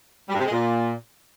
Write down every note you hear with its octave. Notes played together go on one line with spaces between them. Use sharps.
G3
G2
C3
G#3
A#2